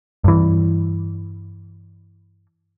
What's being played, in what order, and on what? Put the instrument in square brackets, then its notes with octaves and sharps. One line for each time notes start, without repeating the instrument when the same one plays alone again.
[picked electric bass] G2 E3